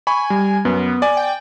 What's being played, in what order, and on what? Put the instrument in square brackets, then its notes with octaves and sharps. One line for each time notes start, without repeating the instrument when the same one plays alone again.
[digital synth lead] G#5 [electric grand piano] B5 C#6
[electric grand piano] G3
[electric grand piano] F#2 [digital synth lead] B3
[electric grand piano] D5 G#5
[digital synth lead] G5